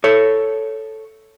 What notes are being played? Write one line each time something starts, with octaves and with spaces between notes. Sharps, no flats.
A4 C#5